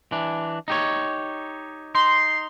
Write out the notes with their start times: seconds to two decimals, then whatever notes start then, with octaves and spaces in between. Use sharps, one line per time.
0.12 E3 D4
0.68 D#4 G4 C#5
1.95 D#4 C6